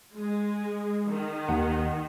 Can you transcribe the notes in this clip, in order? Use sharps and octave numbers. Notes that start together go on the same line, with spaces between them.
G#3
D#3
D#2 F#5